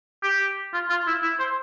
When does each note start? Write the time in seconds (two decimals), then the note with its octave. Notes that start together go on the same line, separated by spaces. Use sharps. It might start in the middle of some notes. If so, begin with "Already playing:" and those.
0.23 G4
0.73 F4
0.90 F4
1.07 E4
1.23 E4
1.39 C5